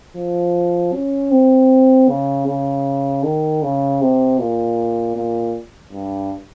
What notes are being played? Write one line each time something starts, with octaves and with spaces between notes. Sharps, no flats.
F3
C#4
C4
C#3
C#3
D#3
C#3
C3
A#2
A#2
G2